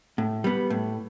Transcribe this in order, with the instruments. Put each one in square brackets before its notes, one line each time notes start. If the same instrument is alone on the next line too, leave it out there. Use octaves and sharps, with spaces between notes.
[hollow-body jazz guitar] A2
G3 B3
A2